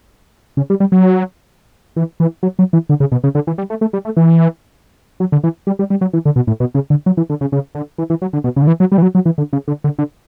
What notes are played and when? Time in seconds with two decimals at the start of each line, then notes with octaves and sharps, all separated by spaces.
0.57 C#3
0.70 G3
0.80 G3
0.92 F#3
1.96 E3
2.20 E3
2.43 F#3
2.59 F#3
2.73 E3
2.89 D3
3.00 C#3
3.12 B2
3.24 C#3
3.35 D3
3.47 E3
3.58 G3
3.70 A3
3.81 A3
3.93 G3
4.05 A3
4.17 E3
5.20 F#3
5.32 D3
5.44 E3
5.67 G3
5.79 G3
5.90 G3
6.01 F#3
6.13 E3
6.25 D3
6.36 B2
6.47 A2
6.60 B2
6.75 C#3
6.90 D3
7.06 F#3
7.17 E3
7.30 D3
7.41 C#3
7.52 C#3
7.75 D3
7.98 E3
8.10 E3
8.22 F#3
8.33 D3
8.44 B2
8.56 C#3
8.62 D3
8.67 E3
8.80 F#3
8.92 G3
8.98 E3
9.02 F#3
9.15 F#3
9.26 E3
9.38 D3
9.53 C#3
9.68 D3
9.84 D3
9.99 D3